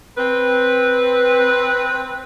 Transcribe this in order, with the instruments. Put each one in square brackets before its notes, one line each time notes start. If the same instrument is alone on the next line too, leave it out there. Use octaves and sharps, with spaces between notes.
[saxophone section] C4 B4